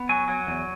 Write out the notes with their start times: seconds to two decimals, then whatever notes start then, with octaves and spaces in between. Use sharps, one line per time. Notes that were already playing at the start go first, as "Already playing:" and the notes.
Already playing: B3
0.09 F#3 G#5
0.28 F#3
0.47 E2